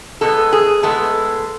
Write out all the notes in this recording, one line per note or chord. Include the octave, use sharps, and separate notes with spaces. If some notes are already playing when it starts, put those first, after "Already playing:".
B2 G#3 B3 A4
G#4
A2 G#3 B3 A4